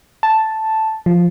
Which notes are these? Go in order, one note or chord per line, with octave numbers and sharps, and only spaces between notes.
A5
F3